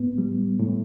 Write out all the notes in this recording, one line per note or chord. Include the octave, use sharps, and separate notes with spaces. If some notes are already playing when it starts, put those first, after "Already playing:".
Already playing: A2 B3
G3
A2